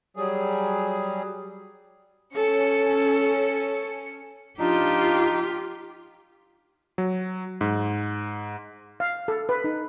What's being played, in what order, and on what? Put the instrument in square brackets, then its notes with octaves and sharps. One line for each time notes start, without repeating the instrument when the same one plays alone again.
[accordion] F#3 G3 G#4
[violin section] C#4 C#7 [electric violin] A4
[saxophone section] F3 D4 [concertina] D#4 [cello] F4 G4
[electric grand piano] F#3
G#2
[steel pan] F5
A4
B4
D#4